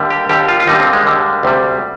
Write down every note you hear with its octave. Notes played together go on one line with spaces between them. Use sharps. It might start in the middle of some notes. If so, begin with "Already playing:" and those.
Already playing: D#2 D3 G3
G4
D#2 D3 G3 G4
F4
F4
D#2 D3 G3 D#4
C4
G#3
D#2 D3 G3
D2 C3 G3